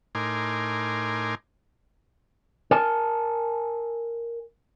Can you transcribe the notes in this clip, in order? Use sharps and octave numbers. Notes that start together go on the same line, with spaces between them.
A2 D#4 A#4 G#5 C6 D6
A#4 G#5 A5